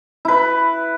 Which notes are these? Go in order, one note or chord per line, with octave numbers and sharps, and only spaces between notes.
E4 B4